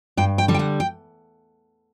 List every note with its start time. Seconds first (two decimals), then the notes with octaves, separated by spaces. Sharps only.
0.17 G2 G5
0.38 G5
0.48 D3 G3
0.54 G5
0.59 F#5
0.80 G5